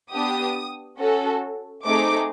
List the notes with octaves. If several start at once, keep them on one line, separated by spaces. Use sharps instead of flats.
B3 D4 G4 D#6
C#4 F#4 A4
A3 C4 D#4 G#4 D6